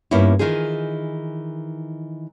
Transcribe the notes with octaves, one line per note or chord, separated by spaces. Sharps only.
G2 A#3 B3 C#4 D#4 E4
D#3 E3 D#4 F4 G#4